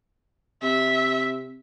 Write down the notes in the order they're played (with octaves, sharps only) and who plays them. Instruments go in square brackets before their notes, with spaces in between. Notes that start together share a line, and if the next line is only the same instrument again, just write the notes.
[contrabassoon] C3 [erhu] E5